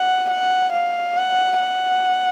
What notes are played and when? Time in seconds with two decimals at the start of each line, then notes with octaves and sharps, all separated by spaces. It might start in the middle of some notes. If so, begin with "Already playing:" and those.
Already playing: F#5
0.30 F#5
0.73 F5
1.17 F#5
1.60 F#5